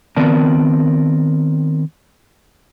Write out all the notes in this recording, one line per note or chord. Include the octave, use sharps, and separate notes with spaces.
D#3 B3 C4 A#4 D5 A5